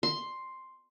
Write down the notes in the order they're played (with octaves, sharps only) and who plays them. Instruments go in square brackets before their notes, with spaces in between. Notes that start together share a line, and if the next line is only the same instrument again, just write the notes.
[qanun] C6